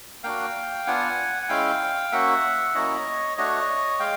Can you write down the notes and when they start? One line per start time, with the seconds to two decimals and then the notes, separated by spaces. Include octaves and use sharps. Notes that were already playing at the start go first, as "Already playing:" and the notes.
0.23 A#3 D4 F#4 F5 G5
0.87 B3 D4 F4 F#5 G#5
1.43 F#5
1.49 G#3 C#4 E4 F5 G5
2.12 A#3 C#4 F#4 E5 F#5
2.75 F#3 A#3 C#4 E4 C#5 D#5
3.37 A3 D4 F#4 C#5 D#5
4.00 G#3 F5 G5